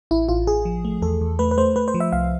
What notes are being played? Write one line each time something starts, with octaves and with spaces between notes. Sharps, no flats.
A1 E4
A1 F4
A1 G#4
F3
A3
E2 A4
E2
A3 B4
B4
A3 C5
A3 B4
C5
F3
E5
C2 F5